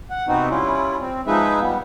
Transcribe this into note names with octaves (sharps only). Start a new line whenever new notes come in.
F#5
C3 B3 C4 D#4 F#4
G3 C#4 E4 F4
C4
F3 G#3 D#4 G#4 B4 E5
G3 B3